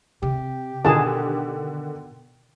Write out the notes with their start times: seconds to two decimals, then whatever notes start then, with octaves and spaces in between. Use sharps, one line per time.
0.23 C3 G4
0.85 B2 D3 D#3 G#4 A5